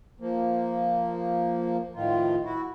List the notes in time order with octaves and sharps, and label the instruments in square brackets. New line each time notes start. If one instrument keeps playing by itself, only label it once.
[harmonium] F3 A#3
A2 D#3 F3 F4
E4 F#4